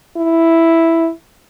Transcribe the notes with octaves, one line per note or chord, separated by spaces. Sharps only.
E4